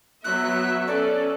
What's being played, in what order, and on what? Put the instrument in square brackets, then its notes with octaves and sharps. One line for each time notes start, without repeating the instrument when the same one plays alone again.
[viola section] F#3 B3 E5 [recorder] F#6
[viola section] C#4 A4 [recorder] D5